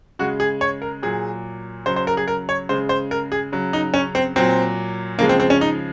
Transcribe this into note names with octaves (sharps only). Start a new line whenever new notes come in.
C#3 G#3 F#4
G#4
C#5
A#4
A#2 F#3 G#4
C#3 F#3 C5
C5
A#4
G#4
A#4
C#5
C#3 G#3 C5
C5
A#4
G#4
C#3 F#3
D#4
C#4
C4
A#2 F#3 C4
C#3 F3 G#3 A#3
C4
C4
C#4
D#4